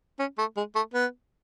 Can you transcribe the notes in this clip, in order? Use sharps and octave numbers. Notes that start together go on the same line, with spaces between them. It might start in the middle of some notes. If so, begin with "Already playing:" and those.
C#4
A3
G#3
A3
B3